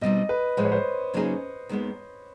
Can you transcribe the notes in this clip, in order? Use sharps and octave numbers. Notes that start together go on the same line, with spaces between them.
B2 G3 C4 D#4 D#5
B4
A2 F3 G#3 C5
C#5
C5
C#3 F#3 A#3 D#4 G#4
D#2 D#3 G#3 B3